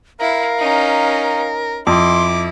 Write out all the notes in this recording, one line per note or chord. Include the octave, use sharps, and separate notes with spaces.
E4 A#4 F5
C#4 D#4
F2 E4 C6 D6